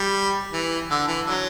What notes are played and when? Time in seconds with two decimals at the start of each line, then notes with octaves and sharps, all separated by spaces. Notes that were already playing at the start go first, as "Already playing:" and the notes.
Already playing: G3
0.53 E3
0.90 D3
1.08 E3
1.26 D3 F#3